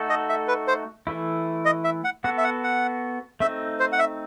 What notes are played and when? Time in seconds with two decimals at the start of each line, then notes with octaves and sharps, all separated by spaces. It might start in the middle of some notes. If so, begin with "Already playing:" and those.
Already playing: A3 D#4 F#4 A4
0.09 D#5
0.29 E5
0.48 B4
0.68 C5
1.07 E3 A3 E4
1.65 D#5
1.84 E5
2.04 F#5
2.24 B3 F#4 A4 F#5
2.38 E5
2.44 F#5
2.64 F#5
3.40 A3 C4 D#4 E5
3.80 C5
3.92 F#5
3.99 E5